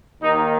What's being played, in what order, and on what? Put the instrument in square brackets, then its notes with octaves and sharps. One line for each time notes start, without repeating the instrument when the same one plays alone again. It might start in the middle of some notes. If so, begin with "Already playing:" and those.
[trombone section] D#2 D#3 A#3 D#4